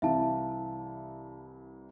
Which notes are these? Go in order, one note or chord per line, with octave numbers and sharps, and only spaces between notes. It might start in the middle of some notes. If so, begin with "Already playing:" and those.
C2 E3 E5 F5 A5